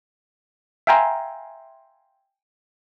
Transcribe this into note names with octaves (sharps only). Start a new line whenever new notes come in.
E5 F5 G5 G#5 A#5 C6